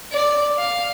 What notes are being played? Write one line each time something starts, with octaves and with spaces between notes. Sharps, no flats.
D5
F5